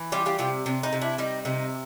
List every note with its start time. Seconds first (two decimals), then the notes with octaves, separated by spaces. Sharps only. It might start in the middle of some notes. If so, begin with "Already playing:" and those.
Already playing: E3
0.12 G3 F4 G4
0.26 F4 G4
0.38 C3 F4 G4
0.66 C3 D4
0.83 D#4
0.93 C3
1.01 D4 E4
1.18 G3 D#4
1.45 C3 D#4